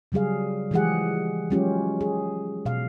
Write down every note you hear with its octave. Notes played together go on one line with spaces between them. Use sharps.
C#3 F#3 G3 G#4 F5
E3 F3 G#3 G4 G#4 F#5
F#3 G#3 C#4 F4 G4
G#4
B2 F5